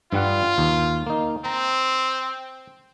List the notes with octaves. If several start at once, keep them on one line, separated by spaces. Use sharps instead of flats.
G2 G3 F4 F#5
D#2
A#3 D#4
C4 A#5